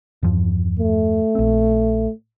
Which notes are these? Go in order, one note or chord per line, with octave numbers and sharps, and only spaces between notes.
E2 G2 F3
A3
A#1 C4